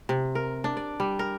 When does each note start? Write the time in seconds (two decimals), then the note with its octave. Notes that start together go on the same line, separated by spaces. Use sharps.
0.09 C3
0.35 A#4
0.64 D4
0.77 D5
1.00 G3
1.19 A#4